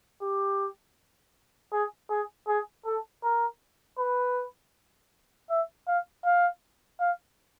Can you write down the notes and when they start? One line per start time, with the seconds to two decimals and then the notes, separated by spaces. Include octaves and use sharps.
0.22 G4
1.72 G#4
2.10 G#4
2.47 G#4
2.85 A4
3.23 A#4
3.98 B4
5.50 E5
5.87 F5
6.25 F5
7.00 F5